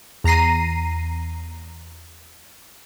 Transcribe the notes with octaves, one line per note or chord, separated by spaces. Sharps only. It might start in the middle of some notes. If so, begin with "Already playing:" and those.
E2 A#5 A#6 C7 D#7